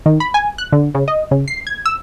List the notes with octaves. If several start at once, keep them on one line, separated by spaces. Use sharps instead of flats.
D#3
B5
G#5
F#6
D3
C#3
D#5
C#3
C7
G#6
E6